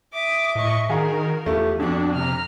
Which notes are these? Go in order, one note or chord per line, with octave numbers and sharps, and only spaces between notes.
E5 D6 D#6
A2 D#5 C#6
D#3 F#4 G#4 A#4 F5 A#5
E2 A3 F4 G4
F2 B3 D4 F#4
C3 A#5 F6